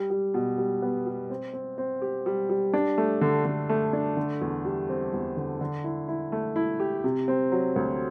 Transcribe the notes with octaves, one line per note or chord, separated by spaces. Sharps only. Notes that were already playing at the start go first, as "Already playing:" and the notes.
Already playing: G3
G3
B2
G3
B3
G3
C4
C4
C4
G4
G3
G3
D4
A3
D3
D3
A3
D4
D3
E2
G3
C4
E2
D3
D3
E4
E4
A3
E4
G4
C3
C4
F#3
D2